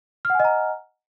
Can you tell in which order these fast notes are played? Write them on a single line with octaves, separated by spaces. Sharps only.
F6 F#5 G#5 D#5 A#5